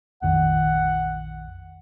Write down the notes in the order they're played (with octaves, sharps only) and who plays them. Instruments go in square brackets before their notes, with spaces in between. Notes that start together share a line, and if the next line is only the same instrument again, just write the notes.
[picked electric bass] A#1 F2 D#3 [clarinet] F#5